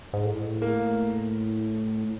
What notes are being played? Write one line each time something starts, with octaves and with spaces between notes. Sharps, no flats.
G#2
A2
A#3